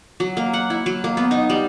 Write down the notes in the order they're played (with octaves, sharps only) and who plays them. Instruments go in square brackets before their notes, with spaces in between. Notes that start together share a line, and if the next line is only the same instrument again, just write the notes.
[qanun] F#3
A#3
F#5
E4
F#3
A#3
B3
D#4
G3